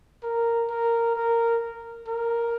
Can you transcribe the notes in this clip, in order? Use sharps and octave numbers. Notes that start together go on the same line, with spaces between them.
A#4
A#4
A#4
A#4